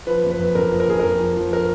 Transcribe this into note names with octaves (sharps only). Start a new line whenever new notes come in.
F3 B4
F#1
B4
F2
F#1 A#4
F3
A#4
F#1 G#4
F2 A#4
F3
F3
A#4